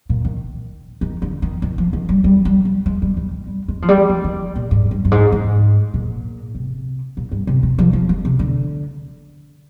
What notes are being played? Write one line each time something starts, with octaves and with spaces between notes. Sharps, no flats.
A#2
D#3
D#3
D3
D#3
D#3
F3
D#3
G3
G3
G3
G3
G#3
G3
G3
G3
G3
G#3
F3
G3
F3
D#3
A#2
G#2
G2
G2
G#2
G#2
A#2
C3
A#2
G2
C3
C3
F3
F3
G#3
C3
D3